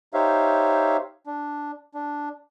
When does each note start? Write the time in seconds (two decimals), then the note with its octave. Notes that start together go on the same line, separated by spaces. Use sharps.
0.14 D#4 G4 C5 C#5 E5 F5
1.27 D4
1.95 D4